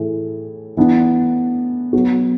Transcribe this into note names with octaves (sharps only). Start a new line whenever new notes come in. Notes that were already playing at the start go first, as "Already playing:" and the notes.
Already playing: A2 E3 A3 E4 G#4
E3 B3 D4
F#3 B3 F#4